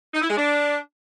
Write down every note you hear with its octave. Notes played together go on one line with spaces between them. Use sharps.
D#4
E4
G#3
D4